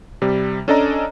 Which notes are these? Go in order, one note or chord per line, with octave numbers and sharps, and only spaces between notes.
C3 G3
C#4 D4 A4 D5 D#5 A#5